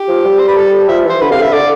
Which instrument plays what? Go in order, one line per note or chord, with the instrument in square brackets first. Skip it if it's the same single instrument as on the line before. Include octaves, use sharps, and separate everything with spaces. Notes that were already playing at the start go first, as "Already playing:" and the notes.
Already playing: [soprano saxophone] G4
[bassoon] F3
G3
[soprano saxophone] C5
B4
A4
[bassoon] F3 [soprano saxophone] E5
[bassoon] E3 [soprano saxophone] C5
[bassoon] D3 [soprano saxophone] B4
[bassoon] C3 [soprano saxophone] F5
[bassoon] D3 [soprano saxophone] E5
[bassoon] D3 [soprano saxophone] D5